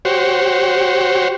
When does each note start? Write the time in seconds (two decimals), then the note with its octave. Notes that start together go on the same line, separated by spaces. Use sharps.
0.05 F#4 G4 C5 C#5